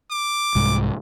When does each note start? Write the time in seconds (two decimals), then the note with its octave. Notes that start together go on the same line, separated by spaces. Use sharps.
0.11 D6
0.55 C2 G#2